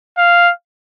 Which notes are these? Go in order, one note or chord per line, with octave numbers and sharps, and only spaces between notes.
F5